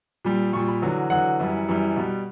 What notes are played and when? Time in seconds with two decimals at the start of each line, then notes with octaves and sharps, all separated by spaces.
0.25 A#2 G3
0.53 A#2 G3 C#6
0.68 B5
0.82 E2 D3 F#3
1.10 E2 D3 F#3 F#5
1.40 F#2 E3 G3
1.68 F#2 E3 G3
1.96 B2 G3